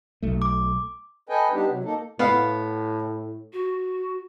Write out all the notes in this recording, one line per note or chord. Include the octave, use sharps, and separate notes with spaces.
B1 A3
D6
A4 B4 D#5 G5 G#5
G3 B3 D4 D#4 G4
C3 F#3
A#3 D#4 A4
A2 B3 F5
F#4